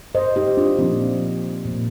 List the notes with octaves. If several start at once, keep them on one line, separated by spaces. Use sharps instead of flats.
C5 D#5
D#4 G4
D4 F4
A#2 F3 A#3 C4
A#2 F3 A#3